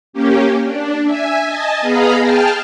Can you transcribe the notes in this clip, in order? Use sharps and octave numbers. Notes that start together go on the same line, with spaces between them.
A#3 C#4 G4
D4
E5 G#5
D#5 G#5 A5
B3 G#4 D#5 F5 A#5 B5
G#4 G5 A5 F6